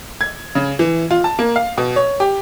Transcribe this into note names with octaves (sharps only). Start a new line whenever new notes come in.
G#6
C#3
E3
F4
A5
A#3
F5
B2
C#5
G4